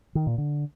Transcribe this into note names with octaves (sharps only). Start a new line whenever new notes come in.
D#3
A#2
D3